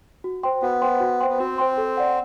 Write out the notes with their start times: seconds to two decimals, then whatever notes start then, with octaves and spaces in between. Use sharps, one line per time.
0.24 F#4
0.43 C5 G5 C6
0.62 B3 F#4
0.81 C5 G5 C6
1.00 F#4
1.20 C5 G5 C6
1.30 B3
1.39 C4 F#4
1.58 C5 G5 C6
1.77 A4
1.97 D5 F#5